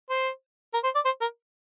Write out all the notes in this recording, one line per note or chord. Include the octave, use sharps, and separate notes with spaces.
C5
A#4
C5
D5
C5
A#4